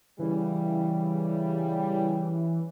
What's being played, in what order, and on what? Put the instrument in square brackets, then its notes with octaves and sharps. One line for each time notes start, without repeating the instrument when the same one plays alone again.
[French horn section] C#3 G3 [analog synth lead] E3